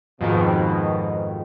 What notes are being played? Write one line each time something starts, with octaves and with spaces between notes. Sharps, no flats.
F2 G#2 B2 D#3